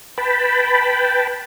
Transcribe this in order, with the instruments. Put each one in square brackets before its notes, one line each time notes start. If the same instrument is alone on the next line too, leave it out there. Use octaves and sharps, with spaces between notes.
[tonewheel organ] B4 G5 A5 B5